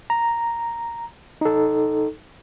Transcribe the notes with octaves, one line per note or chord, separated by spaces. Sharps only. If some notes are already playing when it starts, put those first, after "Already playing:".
A#5
D#4 A4